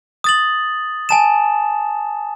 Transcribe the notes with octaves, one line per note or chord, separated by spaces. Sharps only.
D#6 A6 F#7
G#5 A5 E7